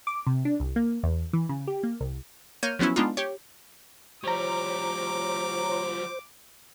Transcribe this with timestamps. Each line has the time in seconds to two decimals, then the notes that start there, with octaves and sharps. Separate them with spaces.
0.07 D6
0.27 C3
0.45 D4
0.60 C2
0.76 A#3
1.03 E2
1.33 E3
1.49 C#3
1.67 G4
1.83 A#3
2.00 C2
2.63 A#3 C#5 F6 G6 D#7
2.79 F3 F#3 B3 C#4 E4
2.96 G#3 B3 D4 D#4 F4
3.17 G4 C#5
4.24 F3 G3 C5 C#5 A#5 D6